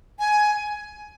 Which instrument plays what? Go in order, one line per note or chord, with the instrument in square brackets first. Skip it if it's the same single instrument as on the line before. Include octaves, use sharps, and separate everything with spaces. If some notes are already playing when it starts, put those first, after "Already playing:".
[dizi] G#5